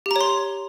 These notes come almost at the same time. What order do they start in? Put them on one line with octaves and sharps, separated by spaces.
G4 A#5 C#5 C6